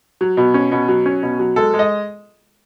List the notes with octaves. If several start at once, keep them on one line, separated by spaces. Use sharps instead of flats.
F#3
B2
C#4
B2
F#3
C#4
B2
F#3
G#3 A4
G#3
D#5